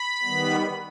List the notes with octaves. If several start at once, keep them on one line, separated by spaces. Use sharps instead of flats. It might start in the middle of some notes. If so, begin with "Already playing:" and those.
Already playing: B5
D#3 G3 B3